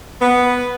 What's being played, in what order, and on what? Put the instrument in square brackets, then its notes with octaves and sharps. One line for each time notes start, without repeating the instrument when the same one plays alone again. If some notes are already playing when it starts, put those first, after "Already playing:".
[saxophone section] B3